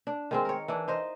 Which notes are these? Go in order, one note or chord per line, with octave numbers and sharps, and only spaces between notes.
D4
D#3 G#3 C4
A#4 C#5
E3 D4
D#4 C5 D#5